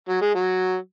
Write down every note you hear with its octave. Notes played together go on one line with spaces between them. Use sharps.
F#3
G#3
F#3